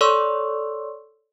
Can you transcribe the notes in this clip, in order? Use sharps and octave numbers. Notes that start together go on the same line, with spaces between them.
A4 C#5 D5 C6 C#6 E6